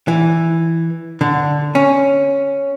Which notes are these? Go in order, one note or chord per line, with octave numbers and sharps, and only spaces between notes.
E3
D3
C#4